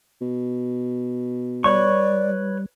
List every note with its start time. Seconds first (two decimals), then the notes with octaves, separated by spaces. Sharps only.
0.21 B2
1.64 G3 B4 C#5 D5 C#6